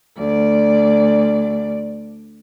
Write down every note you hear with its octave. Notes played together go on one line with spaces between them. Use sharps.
D2 D5